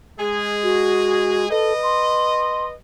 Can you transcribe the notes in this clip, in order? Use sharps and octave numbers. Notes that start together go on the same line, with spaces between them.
G#3 G#4
F#4
A4 B4 D#5
C6